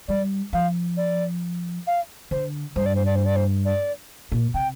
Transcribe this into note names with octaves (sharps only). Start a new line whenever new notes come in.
G3 D5
F3 F5
D5
F5
D3 C5
G2 C5
D5
C5
D5
C5
D5
C5
D5
A#2
C3 G5